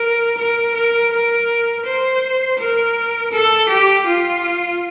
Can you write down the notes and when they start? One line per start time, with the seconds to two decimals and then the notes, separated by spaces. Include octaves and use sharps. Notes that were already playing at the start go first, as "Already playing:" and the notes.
Already playing: A#4
0.38 A#4
0.75 A#4
1.12 A#4
1.86 C5
2.59 A#4
3.32 A4
3.69 G4
4.06 F4